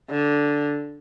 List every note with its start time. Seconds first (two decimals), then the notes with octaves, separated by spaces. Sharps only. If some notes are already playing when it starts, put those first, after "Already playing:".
0.10 D3